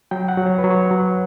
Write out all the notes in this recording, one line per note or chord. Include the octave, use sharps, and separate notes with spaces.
F#3 G5
F#5
F#3
C#5
B4
F#3
C#5
F#3